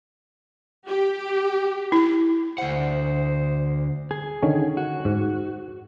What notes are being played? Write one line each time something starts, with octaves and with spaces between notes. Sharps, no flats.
G4
E4
D2 C5 F#5
G#4
D3 D#3 C#4
F#4
G#2